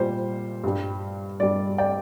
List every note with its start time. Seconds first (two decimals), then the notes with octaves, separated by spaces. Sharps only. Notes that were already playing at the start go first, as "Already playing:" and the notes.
Already playing: A#2 G3 C5
0.64 G2 G3
1.40 G2 G3 D5
1.78 D5 G5